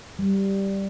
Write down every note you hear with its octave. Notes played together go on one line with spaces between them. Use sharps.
G3